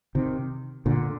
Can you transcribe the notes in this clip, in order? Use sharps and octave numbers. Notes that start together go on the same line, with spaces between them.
C3 D#3
A#2 D3